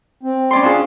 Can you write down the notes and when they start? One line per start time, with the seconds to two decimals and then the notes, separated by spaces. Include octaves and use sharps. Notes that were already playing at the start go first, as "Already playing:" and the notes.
0.23 C4
0.51 C#4 D5 C6
0.64 D4 F4 G#4